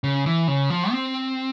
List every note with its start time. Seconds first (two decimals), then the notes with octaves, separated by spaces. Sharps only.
0.04 C#3
0.26 E3
0.48 C#3
0.70 F3
0.91 C4